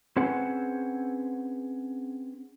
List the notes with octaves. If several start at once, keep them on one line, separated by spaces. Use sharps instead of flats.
C4 C#4 G#4 B4 C5 F#5